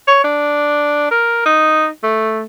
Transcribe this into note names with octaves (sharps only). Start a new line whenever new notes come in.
C#5
D4
A#4
D#4
A3